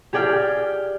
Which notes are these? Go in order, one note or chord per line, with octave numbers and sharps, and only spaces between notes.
G4 G#4 D5 G5 F6